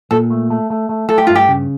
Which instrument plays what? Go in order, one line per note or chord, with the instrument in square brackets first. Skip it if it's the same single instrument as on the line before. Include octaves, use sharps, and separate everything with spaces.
[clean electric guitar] A#2 [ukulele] A4
[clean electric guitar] A3
A3
A3
A3
[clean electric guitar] A3 [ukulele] A4
[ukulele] G4
[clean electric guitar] G2 [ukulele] F4
[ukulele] G4
[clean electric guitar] C#3